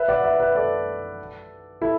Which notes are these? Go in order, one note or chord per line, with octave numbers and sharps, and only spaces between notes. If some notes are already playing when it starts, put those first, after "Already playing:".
Already playing: B4 E5
D5 F#5
B4 E5
B4 E5
A4 D5
E4 A4